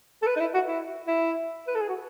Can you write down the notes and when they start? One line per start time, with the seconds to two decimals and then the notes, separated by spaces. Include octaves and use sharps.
0.22 A4
0.27 B4
0.36 D#4
0.40 E4
0.54 F#4
0.67 E4
1.07 E4
1.67 B4
1.75 A4
1.81 G#4
1.88 F#4